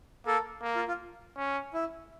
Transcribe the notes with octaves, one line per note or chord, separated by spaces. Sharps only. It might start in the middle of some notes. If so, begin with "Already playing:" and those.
A#3 A4
A#3
F4
F4
C#4
E4